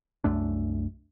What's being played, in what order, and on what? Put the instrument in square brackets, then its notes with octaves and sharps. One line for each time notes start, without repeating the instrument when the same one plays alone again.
[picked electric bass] C2 F#2 A3 D4